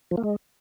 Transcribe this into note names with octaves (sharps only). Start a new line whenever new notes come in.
F3
A#3
G#3